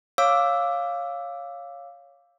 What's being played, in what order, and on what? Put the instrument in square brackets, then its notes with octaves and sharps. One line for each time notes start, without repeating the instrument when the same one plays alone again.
[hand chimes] C#5 F5 D6 E6